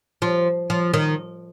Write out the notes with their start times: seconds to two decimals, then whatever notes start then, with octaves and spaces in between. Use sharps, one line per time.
0.22 F3
0.70 F3
0.94 D#3